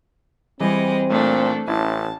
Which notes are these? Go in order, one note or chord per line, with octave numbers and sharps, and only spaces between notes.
E3 G3 G#3 C4 D#5
A#2 A3 D4 A4
A1 C#4 E4 A5